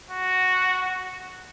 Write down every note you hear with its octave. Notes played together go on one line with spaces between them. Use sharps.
F#4